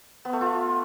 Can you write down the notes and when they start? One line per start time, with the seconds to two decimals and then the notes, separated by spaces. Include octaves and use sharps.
0.25 B3
0.33 A3
0.41 F4